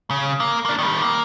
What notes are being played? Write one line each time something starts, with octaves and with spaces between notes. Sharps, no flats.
C#3
A#3
A#3 D4
D#3 G3
A#3